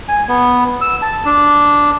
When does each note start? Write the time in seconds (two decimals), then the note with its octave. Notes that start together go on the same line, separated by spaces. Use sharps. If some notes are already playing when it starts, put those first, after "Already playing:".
0.09 G#5
0.28 B3
0.81 E6
1.02 A5
1.25 D4